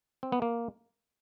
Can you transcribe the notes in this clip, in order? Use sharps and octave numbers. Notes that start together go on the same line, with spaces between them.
C4
B3
A#3